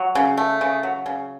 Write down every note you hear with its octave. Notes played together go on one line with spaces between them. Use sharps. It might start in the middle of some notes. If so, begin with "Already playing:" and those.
Already playing: F#3
C#3
A3
C#3
F#3
C#3